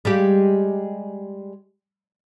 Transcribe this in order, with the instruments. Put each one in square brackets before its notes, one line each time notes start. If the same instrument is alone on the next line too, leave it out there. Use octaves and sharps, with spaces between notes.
[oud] G3 G#3 G4